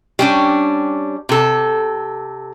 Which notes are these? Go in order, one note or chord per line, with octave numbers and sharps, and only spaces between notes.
G3 C#4 D4
C3 A4